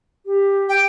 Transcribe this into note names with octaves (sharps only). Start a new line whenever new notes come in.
G4
G5